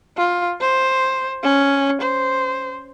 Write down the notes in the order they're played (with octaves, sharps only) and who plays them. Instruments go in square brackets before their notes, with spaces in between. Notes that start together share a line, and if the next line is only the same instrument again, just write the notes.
[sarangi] F4
C5
C#4
C5